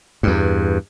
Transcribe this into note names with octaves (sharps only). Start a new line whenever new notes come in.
E2 G2